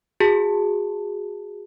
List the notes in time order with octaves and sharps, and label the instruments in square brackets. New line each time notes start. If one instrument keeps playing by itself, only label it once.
[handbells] F#4 G#4 A5